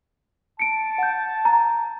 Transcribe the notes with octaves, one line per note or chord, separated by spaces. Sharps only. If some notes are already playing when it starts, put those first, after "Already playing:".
A5 C#7 D7
F#5 G6
A#5